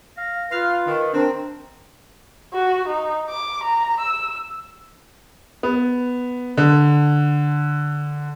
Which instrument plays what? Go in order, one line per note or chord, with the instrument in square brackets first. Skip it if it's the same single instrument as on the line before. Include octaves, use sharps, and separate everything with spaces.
[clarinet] F5 [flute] A#6
[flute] F4 [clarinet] B4 [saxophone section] F5
[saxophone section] D#3
[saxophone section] C4 [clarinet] D4 [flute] A#4
[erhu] F#4
D#4
D6
A#5
E6
[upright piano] B3
D3